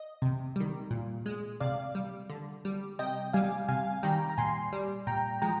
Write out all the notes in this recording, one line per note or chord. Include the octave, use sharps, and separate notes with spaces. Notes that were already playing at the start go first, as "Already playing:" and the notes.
Already playing: D#5
C3
D#3 G3
A#2
G#3
C3 D5 F5
G3
D3
G3
C3 D#5 G5
G3 F5 G#5
C3 F5 G#5
D#3 G3 G5 A#5
A#5
A#2 G#5 C6
G3
A#2 G5 A#5
F3 G#3 G5 A#5